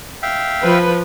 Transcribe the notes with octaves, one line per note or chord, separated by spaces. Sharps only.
E5 F5 G5
F3 B4